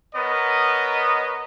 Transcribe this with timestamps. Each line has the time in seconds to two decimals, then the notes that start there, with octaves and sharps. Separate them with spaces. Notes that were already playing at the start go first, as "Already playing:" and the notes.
0.15 B3 A#4 C#5 D#5